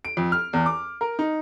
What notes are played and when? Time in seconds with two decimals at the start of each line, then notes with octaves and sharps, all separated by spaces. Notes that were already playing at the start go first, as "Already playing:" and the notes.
0.05 D7
0.17 F2
0.32 F6
0.53 E2
0.66 D6
1.01 A#4
1.19 D#4